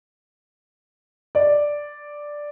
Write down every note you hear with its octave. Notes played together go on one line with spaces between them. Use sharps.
D5